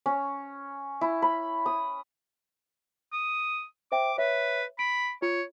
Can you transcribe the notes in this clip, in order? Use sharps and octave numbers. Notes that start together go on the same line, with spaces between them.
C#4
E4
B5
D#6
D#6
C5 E5 G5 D6
B4 C#5 E5
B5 D7
F4 C#5